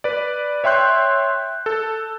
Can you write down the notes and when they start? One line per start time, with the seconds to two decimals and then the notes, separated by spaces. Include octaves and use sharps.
0.04 B4 D5
0.64 C#5 E5 G5 C6 F#6 G6
1.66 A4